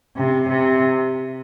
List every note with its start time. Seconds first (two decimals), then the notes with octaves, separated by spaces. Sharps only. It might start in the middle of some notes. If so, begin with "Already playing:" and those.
0.16 C3
0.49 C3